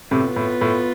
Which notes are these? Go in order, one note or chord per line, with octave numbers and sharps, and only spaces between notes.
A2 C3 B3 F4 B4
A2
A2